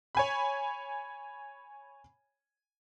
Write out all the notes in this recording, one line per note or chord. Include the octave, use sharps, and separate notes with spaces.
C#5 G#5 B5